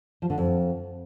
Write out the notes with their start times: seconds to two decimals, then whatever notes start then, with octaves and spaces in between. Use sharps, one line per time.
0.22 F3
0.30 D3
0.38 F2